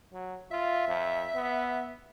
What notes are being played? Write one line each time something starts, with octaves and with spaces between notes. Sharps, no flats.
F#3
F4 E5
F2
B3